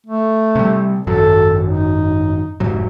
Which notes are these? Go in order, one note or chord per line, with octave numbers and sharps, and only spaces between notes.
A3
C3 G3
G#1 F#2 F#3 A4
D#4
F1 G#2 F#3